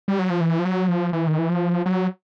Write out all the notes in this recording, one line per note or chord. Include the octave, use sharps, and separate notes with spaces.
G3
F#3
F3
E3
F3
F#3
F3
E3
D#3
E3
F3
F#3